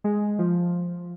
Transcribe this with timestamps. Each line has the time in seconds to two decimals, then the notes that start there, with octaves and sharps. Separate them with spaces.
0.04 G#3
0.39 F3